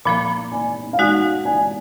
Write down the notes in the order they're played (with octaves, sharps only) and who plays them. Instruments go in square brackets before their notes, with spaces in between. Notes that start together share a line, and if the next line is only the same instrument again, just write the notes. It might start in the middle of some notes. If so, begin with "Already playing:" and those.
[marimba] A#2 F3 A#3 [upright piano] B5
[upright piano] G#5
F5
[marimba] G#3 D#4 F#4 [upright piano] F#5
[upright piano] G#5